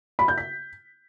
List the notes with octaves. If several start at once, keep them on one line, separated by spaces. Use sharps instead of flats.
B5
G6
B6